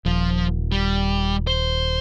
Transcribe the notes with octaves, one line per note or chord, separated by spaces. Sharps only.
D#1 F3
G3
C5